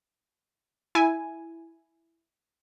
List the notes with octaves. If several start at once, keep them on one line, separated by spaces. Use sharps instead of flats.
E4 G#5